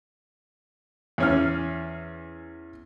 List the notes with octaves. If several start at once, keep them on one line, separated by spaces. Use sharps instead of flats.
E2 C#4 F6